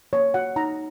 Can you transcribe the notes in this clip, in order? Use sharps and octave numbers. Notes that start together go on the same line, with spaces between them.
A#3 C#5
F#4 F#5
D#4 A#5